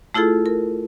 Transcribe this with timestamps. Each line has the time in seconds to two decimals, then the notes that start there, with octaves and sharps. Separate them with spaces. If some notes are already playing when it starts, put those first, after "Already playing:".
0.14 A3 E4 F4 G#4 A4
0.46 A#4